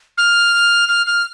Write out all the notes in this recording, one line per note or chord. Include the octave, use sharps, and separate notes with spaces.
F6
F6
F6